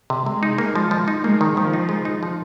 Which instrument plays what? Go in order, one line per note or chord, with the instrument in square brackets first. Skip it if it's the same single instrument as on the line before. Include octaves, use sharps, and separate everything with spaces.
[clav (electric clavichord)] C3
[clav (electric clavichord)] C3 [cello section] G#3
[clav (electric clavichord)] D#4
A#3
F3
F3
D#4
[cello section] G#3 [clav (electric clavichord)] A#3
[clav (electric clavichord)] D#3
[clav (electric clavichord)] D#3 [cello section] F3
[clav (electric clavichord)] D#4
G#3
D#4
F3